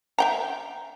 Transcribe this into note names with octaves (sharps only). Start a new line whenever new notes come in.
E5 G5 A#5